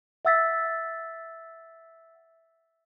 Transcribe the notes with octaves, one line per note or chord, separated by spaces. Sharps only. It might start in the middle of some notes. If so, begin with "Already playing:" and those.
E5 F#5 E6 A6 B6